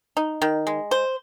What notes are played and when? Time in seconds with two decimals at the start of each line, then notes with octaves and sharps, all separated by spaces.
0.17 D#4
0.42 D#3
0.67 G#3
0.91 C5